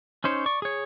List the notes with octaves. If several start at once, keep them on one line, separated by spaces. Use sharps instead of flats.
C#4 D#4 C5 C#5
D5 C#6
G#4 C#5